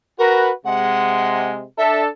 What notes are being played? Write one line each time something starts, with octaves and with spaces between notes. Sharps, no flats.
F#4 A#4 B4
C3 G#3 F#5
D4 A4 E5